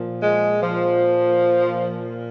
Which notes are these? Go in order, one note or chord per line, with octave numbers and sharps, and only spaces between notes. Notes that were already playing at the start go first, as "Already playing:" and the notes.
Already playing: A#2 F3
G#3
F3